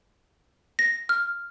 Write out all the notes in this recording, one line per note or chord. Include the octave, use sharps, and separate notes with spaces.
A#6
F6